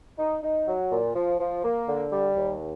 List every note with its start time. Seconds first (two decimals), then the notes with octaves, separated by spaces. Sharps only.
0.19 D#4
0.43 D#4
0.68 F#3
0.91 A#2
1.15 F3
1.40 F3
1.64 A#3
1.88 D3
2.12 G3
2.37 D#2